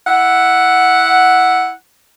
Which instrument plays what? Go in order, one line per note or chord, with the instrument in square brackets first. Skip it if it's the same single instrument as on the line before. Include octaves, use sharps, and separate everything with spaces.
[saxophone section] E4 F#5